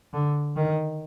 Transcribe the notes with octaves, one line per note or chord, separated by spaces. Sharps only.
D3
D#3